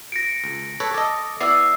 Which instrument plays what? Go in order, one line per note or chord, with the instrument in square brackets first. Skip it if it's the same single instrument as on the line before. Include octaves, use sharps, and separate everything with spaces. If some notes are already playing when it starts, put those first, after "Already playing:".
[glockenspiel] A#6 C#7 D7
[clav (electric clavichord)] C#2
A4 B4 C#5
[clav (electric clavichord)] A4 D#5 [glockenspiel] D6
[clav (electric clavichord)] B3 E4 D5 [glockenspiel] E6 C7